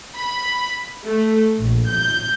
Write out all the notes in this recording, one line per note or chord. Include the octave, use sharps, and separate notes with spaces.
B5
A3
A#1
G6